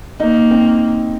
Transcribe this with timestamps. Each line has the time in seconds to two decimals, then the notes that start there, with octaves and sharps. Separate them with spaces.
0.20 A#3 D#4
0.51 C4